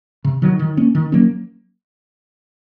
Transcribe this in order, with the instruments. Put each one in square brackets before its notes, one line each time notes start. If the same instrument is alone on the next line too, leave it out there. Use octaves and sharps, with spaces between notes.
[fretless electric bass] C3
D#3 F#3
D#3
A#3 C#4
D#3
F#3 A#3 C#4